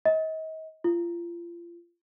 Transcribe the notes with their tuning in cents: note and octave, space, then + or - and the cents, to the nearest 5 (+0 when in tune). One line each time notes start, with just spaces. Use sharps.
D#5 +35
F4 -30